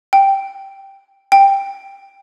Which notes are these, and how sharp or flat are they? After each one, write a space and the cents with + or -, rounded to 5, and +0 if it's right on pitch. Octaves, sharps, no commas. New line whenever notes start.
G5 +0
G5 +10